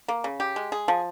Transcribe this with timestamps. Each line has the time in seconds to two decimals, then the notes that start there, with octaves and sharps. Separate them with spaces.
0.08 A#3
0.24 C#3
0.40 G4
0.56 G#3
0.72 G#4
0.88 F3